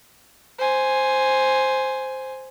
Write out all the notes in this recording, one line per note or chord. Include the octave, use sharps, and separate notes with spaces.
C5 G#5